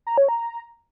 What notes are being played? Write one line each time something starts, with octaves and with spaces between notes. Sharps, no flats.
A#5
C#5
A#5